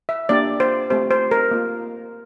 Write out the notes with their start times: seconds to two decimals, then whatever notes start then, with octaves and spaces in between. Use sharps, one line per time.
0.09 E5
0.29 A#3 D4 G4 D5
0.60 C5
0.90 A3 C4 G4 C5
1.11 C5
1.31 A#4
1.51 A#3 F4